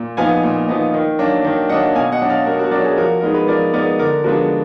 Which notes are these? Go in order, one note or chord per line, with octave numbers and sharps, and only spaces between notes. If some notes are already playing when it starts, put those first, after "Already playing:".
Already playing: A#2
F3 B3 D#4 F5 G#5
A#2
F3 B3 D#4
D#3
F#3 A#3 D4
D#3
F#3 A#3 D4 D#5 F#5
B2 F5 G#5
D#5 F#5
F#3 D4
D5 F5
B2 F#4 A#4
F#4 A#4
F#3 D4 A#4 D5
G#4
F3 F#4 A#4
G#3 B3 D#4 A#4
B4
F3 A#4 D5
G#3 B3 D#4 A#4 D5
D3 A#4 D5
F3 G#3 B3 D4 F#4 A#4